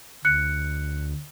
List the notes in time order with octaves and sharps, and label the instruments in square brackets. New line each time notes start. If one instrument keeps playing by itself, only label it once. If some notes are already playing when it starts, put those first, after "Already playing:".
[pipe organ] D2 [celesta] F#6 C#7